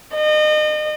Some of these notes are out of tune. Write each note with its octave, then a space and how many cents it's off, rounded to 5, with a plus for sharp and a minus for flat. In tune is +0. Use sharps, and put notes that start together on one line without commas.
D#5 -35